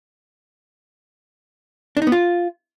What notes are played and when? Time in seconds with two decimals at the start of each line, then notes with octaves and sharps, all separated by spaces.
1.97 D4
2.02 D#4
2.07 B3
2.12 F4